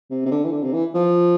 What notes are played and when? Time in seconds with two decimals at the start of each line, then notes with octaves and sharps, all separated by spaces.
0.10 C3
0.26 C3
0.31 D3
0.45 E3
0.52 D3
0.63 C3
0.73 E3
0.94 F3